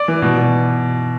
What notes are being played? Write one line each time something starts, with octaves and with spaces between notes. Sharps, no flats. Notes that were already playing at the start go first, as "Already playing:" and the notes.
Already playing: D5
E3
B2
B2